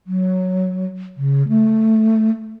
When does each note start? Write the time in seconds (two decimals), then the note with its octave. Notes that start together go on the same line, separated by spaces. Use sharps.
0.07 F#3
1.17 C#3
1.48 A3